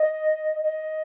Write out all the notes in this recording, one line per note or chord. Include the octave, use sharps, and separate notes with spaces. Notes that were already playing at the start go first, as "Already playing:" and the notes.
Already playing: D#5
D#5